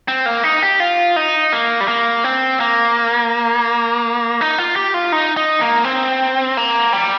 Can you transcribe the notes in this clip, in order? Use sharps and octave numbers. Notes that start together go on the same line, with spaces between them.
C4
A#3
D#4
G4
F4
D#4
A#3
G3
A#3
C4
A#3
D#4
F4
G4
F4
D#4
D#4
A#3
C4
A#3
G3